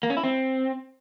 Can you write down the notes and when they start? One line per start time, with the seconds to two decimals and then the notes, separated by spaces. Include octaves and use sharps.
0.03 A#3
0.10 C#4
0.17 E4
0.24 C4